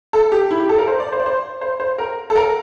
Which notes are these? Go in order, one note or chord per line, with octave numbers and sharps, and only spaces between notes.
A4
G4
E4
G4
A4
A#4
C5
D5
C5
D5
C5
C5
C5
A#4
A4
A#4